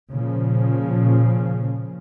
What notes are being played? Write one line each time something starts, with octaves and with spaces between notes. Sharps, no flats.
A#2 C#3 F3